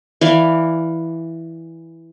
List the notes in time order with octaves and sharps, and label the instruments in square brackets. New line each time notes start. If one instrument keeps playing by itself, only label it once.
[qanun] E3 D5 F5